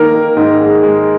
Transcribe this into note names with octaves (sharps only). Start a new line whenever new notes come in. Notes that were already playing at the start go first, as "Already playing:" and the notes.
Already playing: D#3 A#3 A#4
D#3
G#2
G#3
G#3